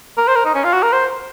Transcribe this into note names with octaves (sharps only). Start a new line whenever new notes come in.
A#4
C5
A#4
D#4
C#4
F4
F#4
A#4
C5